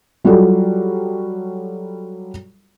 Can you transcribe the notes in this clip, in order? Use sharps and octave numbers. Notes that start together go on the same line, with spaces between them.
F#3 G3 F4 F#4 A4